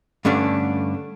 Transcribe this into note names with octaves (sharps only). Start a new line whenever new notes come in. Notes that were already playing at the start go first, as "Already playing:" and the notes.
G2 D3 A3 C#4 D4